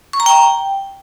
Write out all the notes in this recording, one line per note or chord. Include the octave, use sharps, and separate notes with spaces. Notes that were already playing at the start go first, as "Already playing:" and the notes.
C#6
A#5
G5